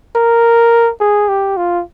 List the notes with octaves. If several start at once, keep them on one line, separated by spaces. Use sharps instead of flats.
A#4
G#4
G4
F4